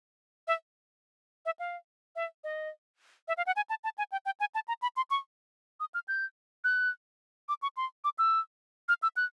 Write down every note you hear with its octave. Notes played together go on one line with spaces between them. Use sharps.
E5
E5
F5
E5
D#5
E5
F5
F#5
G#5
A5
A5
G#5
G5
G5
G#5
A5
A#5
B5
C6
C#6
D#6
F6
G6
F#6
D6
C#6
C6
D6
E6
F6
E6
F#6